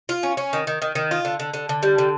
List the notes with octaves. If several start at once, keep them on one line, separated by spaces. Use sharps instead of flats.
F4
C#4
C#4
D#3
D#3
D#3
D#3
F4
D3
D3
D3
D3
G3
D3